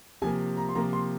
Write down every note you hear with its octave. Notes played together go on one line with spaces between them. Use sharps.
C3 F3 A#3 G#5
A#5
C6
C3 F3 A#3 A#5
C6